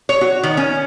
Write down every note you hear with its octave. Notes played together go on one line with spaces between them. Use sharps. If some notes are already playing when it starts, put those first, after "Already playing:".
C#5
F#4
D#3
C#4